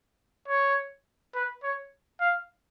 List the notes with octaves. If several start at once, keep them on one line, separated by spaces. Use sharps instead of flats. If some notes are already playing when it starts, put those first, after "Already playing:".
C#5
B4
C#5
F5